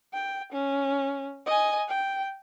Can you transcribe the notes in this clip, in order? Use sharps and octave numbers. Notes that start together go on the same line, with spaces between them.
G5
C#4
D#5 G#5
G5